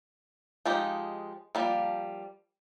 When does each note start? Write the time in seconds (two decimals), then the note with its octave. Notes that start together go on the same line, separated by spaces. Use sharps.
0.66 F3 G#3 D#4 G4
1.55 F3 G3 A#3